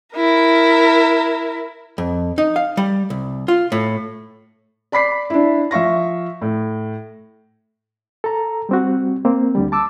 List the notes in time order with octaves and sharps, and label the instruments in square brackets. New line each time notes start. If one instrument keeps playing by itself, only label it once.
[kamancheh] E4 A#4
[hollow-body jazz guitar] F2
D#4
F5
G3
C2
F4
A2
[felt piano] D5 B5 D6 B6 C7
D4 E4
F3 E5 F5 C#6 A#6
A2
[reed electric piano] A4 A#5
G3 C4 F#4
A#3 C4
D2 D3 G3
A5 D6 E6